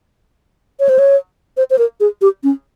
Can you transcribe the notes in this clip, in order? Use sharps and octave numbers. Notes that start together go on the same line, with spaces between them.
C#5
C5
C#5
C5
C5
A#4
G#4
G4
C#4